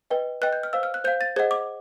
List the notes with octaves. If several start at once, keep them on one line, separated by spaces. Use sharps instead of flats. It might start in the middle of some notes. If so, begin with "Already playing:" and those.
B4 D#5 G5
B4 D#5 G5 F#6
G6
F6
C5 F5 E6
F6
F#6
C5 F5 G6
A6
G#4 C5 D#5 F#5 G#6
D6